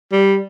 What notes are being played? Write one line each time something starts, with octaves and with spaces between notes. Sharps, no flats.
G3